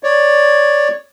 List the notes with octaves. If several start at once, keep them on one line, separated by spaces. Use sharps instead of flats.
C#5 D5